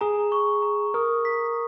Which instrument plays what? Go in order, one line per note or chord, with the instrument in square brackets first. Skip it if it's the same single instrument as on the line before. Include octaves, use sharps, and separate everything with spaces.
[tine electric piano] G#4 [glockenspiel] A#5
[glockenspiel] C#6
A#5
[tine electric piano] A#4 [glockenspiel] D#6
[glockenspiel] B6